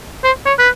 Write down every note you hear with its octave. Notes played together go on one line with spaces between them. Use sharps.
C5
C#5
B4